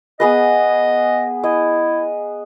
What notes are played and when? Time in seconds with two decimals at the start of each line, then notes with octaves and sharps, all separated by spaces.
0.20 B3 G#4 B4 D#5
1.43 E4 D#5